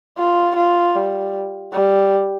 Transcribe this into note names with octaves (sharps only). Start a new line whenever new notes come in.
F4
F4
G3
G3